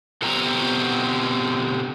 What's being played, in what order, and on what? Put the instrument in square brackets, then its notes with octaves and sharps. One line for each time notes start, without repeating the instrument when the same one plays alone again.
[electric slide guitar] B2 D3 C4 F#4 G4 A#5